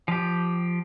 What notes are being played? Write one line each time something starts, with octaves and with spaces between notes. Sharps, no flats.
F3 G4